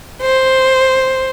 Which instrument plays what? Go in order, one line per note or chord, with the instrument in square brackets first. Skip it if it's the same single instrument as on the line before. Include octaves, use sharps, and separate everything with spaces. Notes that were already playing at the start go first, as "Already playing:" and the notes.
[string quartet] C5